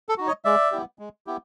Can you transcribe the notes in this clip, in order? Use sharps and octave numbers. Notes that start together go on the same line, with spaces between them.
A4
D#4 F#4
C#5 D#5
G#3 D5 E5
B3 E4 G4
G#3
B3 E4 G4